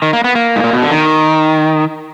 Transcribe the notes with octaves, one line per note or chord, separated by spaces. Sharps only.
D#3
A#3
B3
A#3
G#2
A#2
B2
D3
D#3